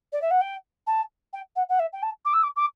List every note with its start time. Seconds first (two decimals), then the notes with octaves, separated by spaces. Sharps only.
0.12 D5
0.21 E5
0.30 F#5
0.41 G5
0.87 A5
1.33 G5
1.56 F#5
1.69 F#5
1.79 E5
1.93 G5
2.02 A5
2.25 D6
2.33 E6
2.43 D6
2.56 D6